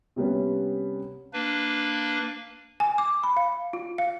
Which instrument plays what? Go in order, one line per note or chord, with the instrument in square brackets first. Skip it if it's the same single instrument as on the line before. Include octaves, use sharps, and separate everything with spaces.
[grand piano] C3 G3 B3 C#4
[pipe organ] A#3 D4 B4
[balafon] G#5
D6
B5
F5
F4
F5